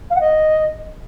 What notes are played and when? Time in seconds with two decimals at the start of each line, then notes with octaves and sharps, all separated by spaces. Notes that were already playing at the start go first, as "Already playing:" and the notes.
0.10 F5
0.15 F#5
0.21 D#5